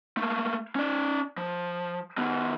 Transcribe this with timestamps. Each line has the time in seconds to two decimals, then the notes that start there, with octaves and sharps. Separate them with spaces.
0.17 A3 A#3
0.75 C#4 D5
1.37 F3
2.18 D#3 B3